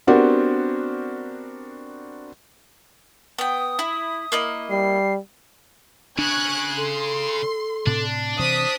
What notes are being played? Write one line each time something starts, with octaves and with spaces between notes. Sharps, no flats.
B3 C4 D4 F#4 G4 A#4
B3 G5 D#6
E4
A#3 E4 D#5
G3 C7
C#3 D4 C#6 F#6 G#6
A4 C6
A2 C3 D4
C3 E3 C5 D#6 B6